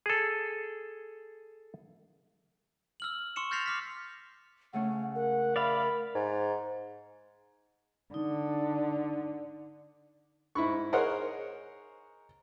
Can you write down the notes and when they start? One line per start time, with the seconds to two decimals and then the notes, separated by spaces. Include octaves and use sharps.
0.06 G#4 A4
3.00 E6 F6 F#7
3.36 C6 C#6 E6 C#7 E7
3.51 F6 G6 A6 A#6 C7 F7
3.66 D6 F6 B6
4.73 C#3 A3 C#4 F#5
5.15 A#4 F#5
5.56 D5 E5 F5 B5
6.15 G#2
8.14 D3 D#4
10.55 G#2 E4 B5 C#6
10.93 G#4 A#4 C5 C#5 D#5 F#5